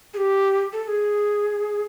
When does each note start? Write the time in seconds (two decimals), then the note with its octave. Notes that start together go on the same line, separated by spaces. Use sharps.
0.14 G#4
0.17 G4
0.73 A4
0.84 A4
0.88 G#4